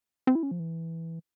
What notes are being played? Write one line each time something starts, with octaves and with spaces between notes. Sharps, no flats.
C4
E4
C#4
F3
E3